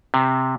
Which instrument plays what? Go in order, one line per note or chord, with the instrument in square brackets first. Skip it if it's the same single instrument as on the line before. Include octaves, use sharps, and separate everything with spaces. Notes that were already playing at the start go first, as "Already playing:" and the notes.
[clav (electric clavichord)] C3